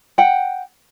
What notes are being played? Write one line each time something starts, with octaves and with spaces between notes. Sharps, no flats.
F#5 G5